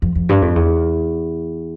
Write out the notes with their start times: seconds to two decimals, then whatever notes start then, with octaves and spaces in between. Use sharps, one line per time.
0.02 F2
0.15 F2
0.29 G2
0.42 F2
0.56 E2